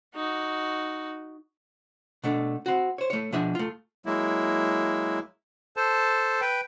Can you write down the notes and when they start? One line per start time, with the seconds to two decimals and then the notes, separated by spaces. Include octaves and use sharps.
0.15 D#4 F#4
2.24 B2 A3 D4
2.66 C4 F#4
2.98 C5 C#5
3.10 A3 C#5
3.32 B2 F3 D4 G#4 E5
3.55 A3 F4
4.06 F#3 G#3 A#3 E4
5.77 A4 C5 A5
6.41 B4 G5